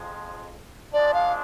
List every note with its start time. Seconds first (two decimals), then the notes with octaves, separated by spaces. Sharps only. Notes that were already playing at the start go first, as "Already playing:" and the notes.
Already playing: F2 F3 G#3
0.93 F3 G#3 D4 D5
1.14 F5